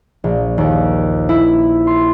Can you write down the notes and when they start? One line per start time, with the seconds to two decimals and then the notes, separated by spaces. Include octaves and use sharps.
0.24 A#1
0.58 D#2
1.29 E4
1.87 C6